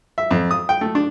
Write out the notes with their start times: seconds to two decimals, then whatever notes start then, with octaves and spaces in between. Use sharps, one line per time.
0.18 E5
0.31 F2
0.51 D#6
0.69 G5
0.81 A3
0.95 D4